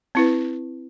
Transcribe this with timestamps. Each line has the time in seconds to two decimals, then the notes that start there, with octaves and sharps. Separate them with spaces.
0.15 C4 E4 B4